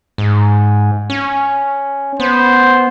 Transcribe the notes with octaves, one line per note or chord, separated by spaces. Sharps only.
G#2
C#4
B3 C5